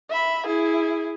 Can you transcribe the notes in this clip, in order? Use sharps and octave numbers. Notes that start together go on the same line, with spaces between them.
E5 B5
E4 G#4